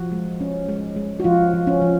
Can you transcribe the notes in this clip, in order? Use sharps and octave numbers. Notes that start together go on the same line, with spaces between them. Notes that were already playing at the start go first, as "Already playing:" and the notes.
Already playing: F3 F#4
G#3
C#4
G#3
G#3
F#4
F3 F4
F3
C#4
F3